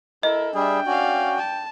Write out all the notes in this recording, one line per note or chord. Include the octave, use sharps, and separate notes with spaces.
E4 A4 A#4 D#5
G3 D4 G#4 E5 G5
C#4 F#4 D5 F5
A5